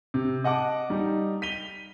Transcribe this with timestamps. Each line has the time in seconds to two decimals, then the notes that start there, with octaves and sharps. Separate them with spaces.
0.14 C3
0.44 D#5 F#5 A5 D6
0.90 G3 D#4
1.42 B6 D#7 F7 G7